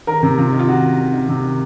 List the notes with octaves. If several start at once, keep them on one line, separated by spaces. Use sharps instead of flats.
D#3 A#4
C3
C3 F4
D#3
F4
D#3 F#4
D#3
D#3
D#3
C3
D#3